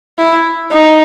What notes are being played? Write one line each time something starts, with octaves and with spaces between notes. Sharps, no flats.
E4
D#4